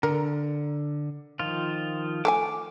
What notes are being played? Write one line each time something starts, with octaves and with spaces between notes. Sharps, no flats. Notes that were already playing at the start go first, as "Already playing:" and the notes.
D3 A#4
D#3 F3 F4
A3 A4 G#5 D6